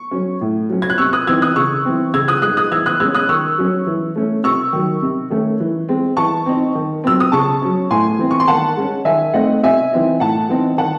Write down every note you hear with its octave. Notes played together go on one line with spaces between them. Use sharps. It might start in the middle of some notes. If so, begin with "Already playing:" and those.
Already playing: C#6
F#3 C#4
A2
F#3 C#4
G#6
F#6
C3 C#6 E6
D#6 F#6
E3 C4 D#4 E6 G#6
D#6 F#6
C#3 C#6 E6
E3 C4
C#3 E6 G#6
D#6 F#6
G#3 D#4 D#6 F#6
D#6 F#6
E3 E6 G#6
D#6 F#6
G#3 C#4 E6 G#6
D#6 F#6
D#3 C#6 E6
F#3 C#4
E3
A3 C#4
C3 C#6 E6
D#3 F#3
C3
D#3 A3 C#4
E3
G#3 C4
E3 A5 C#6
C4 D#4
D#3
F#3 C4 E6
D#6
C#3 A5 C#6
F#3 C#4
A2 G#5 C6
E3 C4
C#6
C6
D#3 F#5 A5
G#3 C#4
D#3 E5 G#5
A3 C4 D#4 D#5 F#5
C3 E5 G#5
E3 C4 D#4
A2 F#5 A5
E3 C4 D#4
D#3 F#5 A5